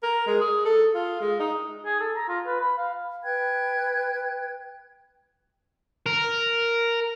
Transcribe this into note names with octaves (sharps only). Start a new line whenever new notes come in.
A#4
G#3
G#4
A4
F4
G#3
D#4
G#4
A4
A#5
F4
B4
B5
F5
B4 G5 F#6 G#6
A#4